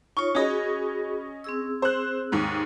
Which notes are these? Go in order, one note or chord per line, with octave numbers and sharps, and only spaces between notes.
D#4 F4 C#5 C#6
C#4 F#4 G#4 D#5 B5
C4 G#4 E6
C5 F#6
D#2 G#2